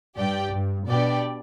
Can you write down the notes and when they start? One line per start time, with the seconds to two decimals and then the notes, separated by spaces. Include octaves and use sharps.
0.16 G2 G4 D5 G5
0.52 G2
0.88 B2 B3 D4 G4 D5 G5